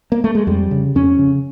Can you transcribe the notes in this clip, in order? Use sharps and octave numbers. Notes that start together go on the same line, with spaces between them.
A#3
A3
G#3
F2 G3
C#3
F2 C#4
C#3